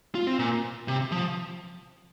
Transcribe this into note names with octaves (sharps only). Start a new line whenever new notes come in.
F4
C4
A#2
C3
F3